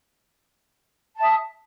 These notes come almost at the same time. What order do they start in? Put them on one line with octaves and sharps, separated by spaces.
A5 E5 D#6